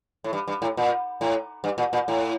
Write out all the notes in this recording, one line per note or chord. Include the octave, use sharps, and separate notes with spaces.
A2
G2
G2
A2
A#2
A2
G2
A#2
A#2
A2